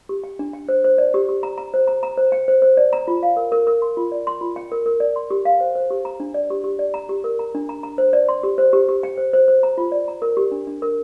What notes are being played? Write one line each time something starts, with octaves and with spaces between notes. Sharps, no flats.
G4
G5
D4
G5
C5
C5
D5
G4
G4
A#5
A#5
C5
A#5
A#5
C5
G5
C5
C5
D5
A#5
F4
F5
A#4
A#4
A#4
C6
F4
D5
C6
F4
G5
A#4
A#4
D5
C6
G4
F5
C5
C5
G4
A#5
D4
D5
G4
G4
D5
A#5
G4
A#4
A#5
D4
A#5
A#5
C5
D5
C6
G4
C5
G4
G4
G5
C5
C5
C5
A#5
F4
D5
A#5
A#4
G4
D4
D4
A#4